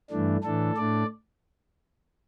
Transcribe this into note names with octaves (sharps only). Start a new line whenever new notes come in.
G2 E3 A3 D4
A2 E3 A3 D4 A4
A2 A3 D4 D5